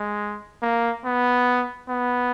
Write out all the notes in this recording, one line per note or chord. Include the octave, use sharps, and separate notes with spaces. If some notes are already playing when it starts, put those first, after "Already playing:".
Already playing: G#3
A#3
B3
B3